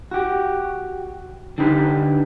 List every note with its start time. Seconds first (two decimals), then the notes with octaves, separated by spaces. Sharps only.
0.11 F#4 G4
1.58 D3 D4 D#4 G4 B4